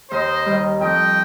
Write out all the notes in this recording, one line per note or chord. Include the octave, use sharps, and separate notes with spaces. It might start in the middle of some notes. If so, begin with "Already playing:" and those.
D#2 C5 D#5
D#3 G3
F2 D#5 G5